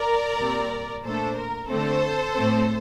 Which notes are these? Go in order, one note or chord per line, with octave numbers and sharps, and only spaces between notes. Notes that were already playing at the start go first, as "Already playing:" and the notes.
Already playing: A#4 D5
A#2 G3 C4
A#2 A3 D4 A4 C5
A#4
D3 A3 C4 A4 C5
A2 A3 C4